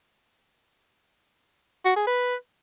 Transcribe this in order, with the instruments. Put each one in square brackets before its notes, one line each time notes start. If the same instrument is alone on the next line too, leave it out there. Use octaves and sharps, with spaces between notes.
[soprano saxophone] F#4
G#4
B4